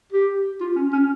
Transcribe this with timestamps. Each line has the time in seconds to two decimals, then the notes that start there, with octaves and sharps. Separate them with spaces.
0.12 G4
0.61 F4
0.76 C#4
0.93 C#4